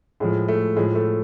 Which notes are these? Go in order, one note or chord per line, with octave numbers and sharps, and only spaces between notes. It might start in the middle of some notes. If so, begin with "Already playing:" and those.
A2 F3 G#3
A3
A2 F3 G#3
A3